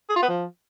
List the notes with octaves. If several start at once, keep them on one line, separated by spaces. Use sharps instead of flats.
G#4
F4
B3
F3